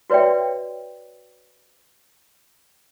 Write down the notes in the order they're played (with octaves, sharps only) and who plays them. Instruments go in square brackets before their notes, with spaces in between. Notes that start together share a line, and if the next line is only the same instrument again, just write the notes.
[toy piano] F#4 B4 C#5 D5 E5 G5